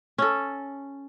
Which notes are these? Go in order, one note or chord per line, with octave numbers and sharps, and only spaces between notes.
C#4 A4